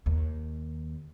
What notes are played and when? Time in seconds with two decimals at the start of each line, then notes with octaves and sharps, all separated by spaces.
0.06 D#2